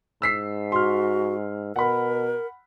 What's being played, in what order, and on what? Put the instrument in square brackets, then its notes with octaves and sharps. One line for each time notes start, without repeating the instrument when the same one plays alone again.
[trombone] G#2 [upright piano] E6 B6 C7
[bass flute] F#4 [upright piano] C6 F6
[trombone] B2 [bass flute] A#4 [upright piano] F#5 B5